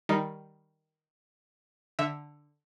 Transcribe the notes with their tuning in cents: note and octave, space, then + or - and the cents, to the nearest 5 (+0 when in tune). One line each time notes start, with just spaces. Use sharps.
D#3 +0 G3 +0 D#4 +0
D3 +5 E5 +0